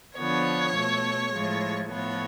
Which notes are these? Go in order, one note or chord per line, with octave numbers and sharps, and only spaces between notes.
D3 F3 B3 C#5
B2 A3
A2 F3 G#3
A2 F3 B3 C#5